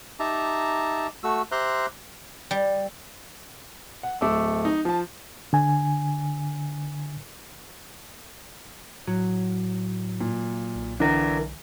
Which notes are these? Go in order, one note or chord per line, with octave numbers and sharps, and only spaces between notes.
D#4 G4 E5 A5 A#5
A3 F#4 E6
G4 C5 E5 A#5 C6 F#6
G3
F#5
D1 A3 D6 E6
D#4
F3 A5
D3 G#5
A2 F#3
A#2
B1
D3 E3 D4 A#4